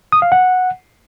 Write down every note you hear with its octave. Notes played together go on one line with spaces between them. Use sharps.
D#6
F5
F#5